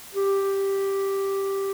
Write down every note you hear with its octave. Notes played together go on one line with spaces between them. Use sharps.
G4